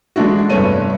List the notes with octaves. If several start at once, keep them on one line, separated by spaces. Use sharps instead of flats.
E3 G#3 A3 D4 E4 F#4
F1 G2 A3 B3 C#5 D#7